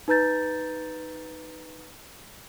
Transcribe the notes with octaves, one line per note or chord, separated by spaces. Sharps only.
D#4 B4 A#5 G6 A6